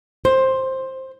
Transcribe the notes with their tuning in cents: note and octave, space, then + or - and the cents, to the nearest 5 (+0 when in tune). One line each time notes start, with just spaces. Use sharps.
C5 +10